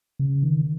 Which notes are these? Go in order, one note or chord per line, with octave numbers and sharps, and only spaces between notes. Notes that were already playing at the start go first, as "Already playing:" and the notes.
C#3
D#3